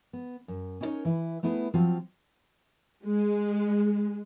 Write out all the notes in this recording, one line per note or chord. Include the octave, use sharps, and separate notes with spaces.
B3
F#2
C#4 D#4 E4 A4 A#4 C#5
E3 E4 B4
A3 B3 E4 G#4 B4
F3 F#3 C4 F4
G#3